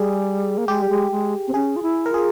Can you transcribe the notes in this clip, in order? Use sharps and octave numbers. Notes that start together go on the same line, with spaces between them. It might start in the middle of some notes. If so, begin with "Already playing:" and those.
Already playing: G3 G#4
A#3
G#3 G4
G3
G#3
G#3
C4
C#4 G#4
F4
E4
A#4
F4 G#4